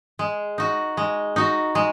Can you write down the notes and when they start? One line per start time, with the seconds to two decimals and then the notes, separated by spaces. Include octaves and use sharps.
0.19 G#3
0.58 D#4 F#4
0.97 G#3
1.36 D#4 F#4
1.75 G#3